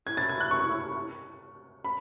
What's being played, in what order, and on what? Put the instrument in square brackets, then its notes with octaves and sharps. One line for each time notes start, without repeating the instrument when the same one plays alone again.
[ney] E4 [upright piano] G#6
[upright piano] A6
G#6
F#6
C#6
B5